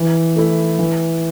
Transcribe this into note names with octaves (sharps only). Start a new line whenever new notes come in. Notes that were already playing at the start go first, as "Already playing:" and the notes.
Already playing: E3
A3 E4
E3